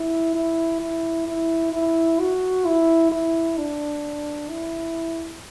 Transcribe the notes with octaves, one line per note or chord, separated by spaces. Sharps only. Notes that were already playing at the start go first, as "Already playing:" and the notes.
Already playing: E4
E4
E4
E4
E4
F#4
E4
E4
D4
E4